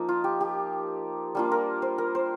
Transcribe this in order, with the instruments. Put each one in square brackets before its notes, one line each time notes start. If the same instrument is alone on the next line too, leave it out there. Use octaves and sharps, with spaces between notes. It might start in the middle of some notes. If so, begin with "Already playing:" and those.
Already playing: [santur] F3 A#3 D#4 D#5
F4
G4
G4
G3 A#3 D4 F4
A#4
C5
A#4
C5